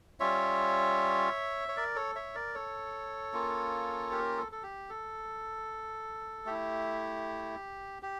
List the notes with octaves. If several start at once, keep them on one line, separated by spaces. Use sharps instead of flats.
G3 C#4 F4 C#5 E5
C#5
A#4 D5
A4 C#5
C#5 E5
A#4 D5
A4 C#5
A#3 C#4 F4
G4 A#4
A4
A4
G4
A4
A3 E4 G4
G4